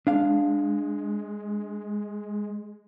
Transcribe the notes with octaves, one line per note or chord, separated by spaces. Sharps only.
G#3 D4 F5